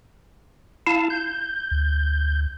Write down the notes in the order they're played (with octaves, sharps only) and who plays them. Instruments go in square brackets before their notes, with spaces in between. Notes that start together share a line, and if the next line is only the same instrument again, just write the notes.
[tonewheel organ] E4 F5 A5
G6
[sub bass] D2